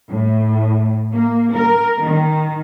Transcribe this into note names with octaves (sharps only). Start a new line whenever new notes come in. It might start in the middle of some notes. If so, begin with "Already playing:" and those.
A2
A#3
A#4
D#3